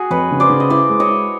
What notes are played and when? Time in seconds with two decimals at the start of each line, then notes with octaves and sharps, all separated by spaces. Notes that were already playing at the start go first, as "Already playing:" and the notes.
Already playing: F#4 G#4
0.10 F2 B4 C#5
0.31 C#3
0.40 C5 D5
0.50 C#3
0.60 D#5
0.69 E4 C5 D5
0.89 G#3
1.00 C#5 D#5
1.09 E4